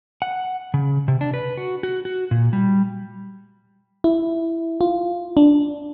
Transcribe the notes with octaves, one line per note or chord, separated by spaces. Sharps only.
F#5
C#3
C3
D4
B4
F#4
F#4
F#4
A#2
G3
E4
F4
D4